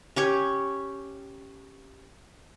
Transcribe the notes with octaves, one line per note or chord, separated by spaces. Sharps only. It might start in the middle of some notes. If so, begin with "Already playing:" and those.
C#4 G4 C#5